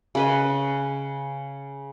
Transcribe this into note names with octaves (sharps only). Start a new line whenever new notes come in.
C#3 B4 D#5